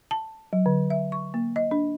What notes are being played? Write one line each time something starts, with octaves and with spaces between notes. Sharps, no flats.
A5
F#3
D3
E5
C#6
A#3
D#5
D4